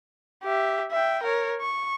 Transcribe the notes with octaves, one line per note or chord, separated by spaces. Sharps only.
G4 E5
E5 G5
A#4 C#5
C#6